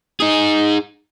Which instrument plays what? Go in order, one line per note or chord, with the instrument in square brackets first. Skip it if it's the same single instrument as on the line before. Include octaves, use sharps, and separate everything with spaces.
[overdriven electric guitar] D#4 G#4